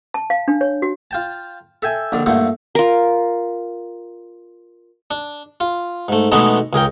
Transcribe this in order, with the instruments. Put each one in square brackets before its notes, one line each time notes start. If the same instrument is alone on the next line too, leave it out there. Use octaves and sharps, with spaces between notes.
[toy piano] A5
F5
D4
C#5
F#4
[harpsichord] F4 G5 A5
A4 E5 G5 G#5
A#1 D3 D#3 D5
G2 A#2 A3 D#4 F#5 C6
[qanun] F4 A#4
[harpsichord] D4
F4
G#2 A3
B2 E3 G#3 A3 B3 D#4
C#2 G#4 A#4 G5